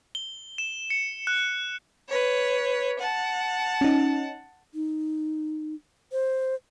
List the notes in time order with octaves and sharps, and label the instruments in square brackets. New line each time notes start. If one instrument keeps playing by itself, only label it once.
[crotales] G7
E7
C#7
F#6
[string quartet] B4 C#5
F#5 A5
[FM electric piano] C#4 D#4
[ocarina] D#4
C5